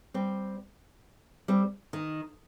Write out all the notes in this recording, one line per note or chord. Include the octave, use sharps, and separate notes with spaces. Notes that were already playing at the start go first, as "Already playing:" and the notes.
G3 C4
G3 C4
D#3